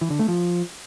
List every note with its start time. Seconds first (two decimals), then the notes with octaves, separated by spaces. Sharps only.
0.01 E3
0.10 D3
0.19 A3
0.28 F3